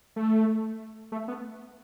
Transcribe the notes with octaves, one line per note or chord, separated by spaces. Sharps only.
A3
A3
B3